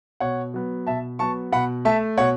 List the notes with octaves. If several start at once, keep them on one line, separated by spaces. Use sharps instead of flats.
B2 C#5 F#5
F#3 B3
B2 E5 A5
F#3 B3 A5 C#6
B2 F#5 B5
A3 E5 A5
B2 C#5 F#5